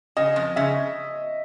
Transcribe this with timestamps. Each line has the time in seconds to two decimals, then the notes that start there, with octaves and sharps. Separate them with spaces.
0.17 C#3 D#5
0.36 F2
0.56 C#3 E5